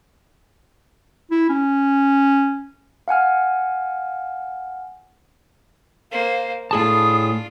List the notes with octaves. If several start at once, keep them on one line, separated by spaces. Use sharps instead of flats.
E4
C#4
F5 F#5 G#5 F6
A#3 C5 F5
A2 D4 F4 G#4 A5 D#6